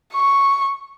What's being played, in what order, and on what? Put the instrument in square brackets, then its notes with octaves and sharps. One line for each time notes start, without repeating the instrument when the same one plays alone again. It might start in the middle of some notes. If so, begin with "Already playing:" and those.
[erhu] C#6